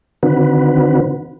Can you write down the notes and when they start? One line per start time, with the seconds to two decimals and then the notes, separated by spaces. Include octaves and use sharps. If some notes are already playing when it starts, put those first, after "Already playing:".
0.23 D3 D#3 C4 F#4 B4